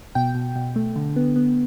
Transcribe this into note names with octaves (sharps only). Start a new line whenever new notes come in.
B2 G5
B2
B2
A3
D3
B3
B3